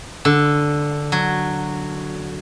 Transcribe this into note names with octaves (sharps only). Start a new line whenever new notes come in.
D3
F#3